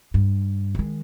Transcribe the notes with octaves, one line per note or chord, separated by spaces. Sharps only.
G2
D#3 G#3